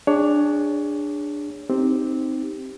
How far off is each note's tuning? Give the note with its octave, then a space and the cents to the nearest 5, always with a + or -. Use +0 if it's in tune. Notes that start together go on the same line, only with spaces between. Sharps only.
D4 +5 G#4 -25 C#5 +20
C4 +0 D#4 +0 G4 +0